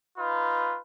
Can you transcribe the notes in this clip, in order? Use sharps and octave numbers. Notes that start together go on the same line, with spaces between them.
D#4 F4 B4